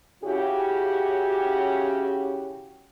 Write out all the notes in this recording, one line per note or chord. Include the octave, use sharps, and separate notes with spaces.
C#3 C#4 E4 F#4 G4